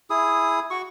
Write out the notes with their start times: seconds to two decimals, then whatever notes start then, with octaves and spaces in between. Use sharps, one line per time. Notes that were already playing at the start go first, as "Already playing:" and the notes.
0.10 E4 G#4 D#6
0.71 F#4 C#6